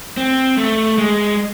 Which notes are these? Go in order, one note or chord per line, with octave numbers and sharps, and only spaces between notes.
C4
A3
G#3